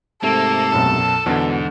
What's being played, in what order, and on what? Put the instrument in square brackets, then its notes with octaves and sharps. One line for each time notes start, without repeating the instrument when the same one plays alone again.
[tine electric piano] G#2 C3 A3 [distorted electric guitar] A#3 [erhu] A4
[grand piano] B1 F#2 B2 [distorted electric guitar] A5
[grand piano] E2 D3 [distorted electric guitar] G#2 [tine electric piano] B2